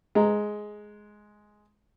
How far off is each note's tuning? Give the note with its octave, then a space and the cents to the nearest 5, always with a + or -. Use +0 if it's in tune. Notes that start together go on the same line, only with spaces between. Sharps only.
G#3 +5 A#5 -5